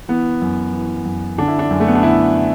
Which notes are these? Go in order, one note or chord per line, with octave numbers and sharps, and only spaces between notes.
E3 B3
F#2
E3
F#2
D3 D4
E4
D4
F#2
A3
B3
D4
D3 E4